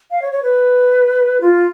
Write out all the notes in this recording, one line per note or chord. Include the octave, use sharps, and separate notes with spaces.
F5
C#5
C#5
B4
F4